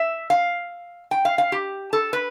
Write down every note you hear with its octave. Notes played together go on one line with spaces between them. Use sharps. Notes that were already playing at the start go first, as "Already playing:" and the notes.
Already playing: E5
F5
G5
F5
F5
G4
A4
B4